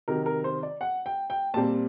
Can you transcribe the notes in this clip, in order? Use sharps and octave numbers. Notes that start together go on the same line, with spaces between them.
C3 D#3 F#3 A#4
A#4
C5
D5
F#5
G5
G5
A#2 G3 C4 A5